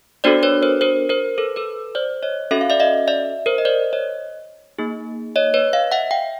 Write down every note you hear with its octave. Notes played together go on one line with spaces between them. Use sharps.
B3 D4 F#4 A4 C5 D5
B4 C#5
A#4 C5
A#4 C5
A#4 C5
A4 B4
A4 B4
C5 D5
C#5 D#5
C#4 F#4 A4 E5
F5
D5 E5
D#5 F5
D5 E5
A#4 C5
D#5
C5 D5
C#5 D#5
A#3 D#4 G#4
C#5 D#5
B4 C#5
D#5 F5
E5 F#5
F5 G5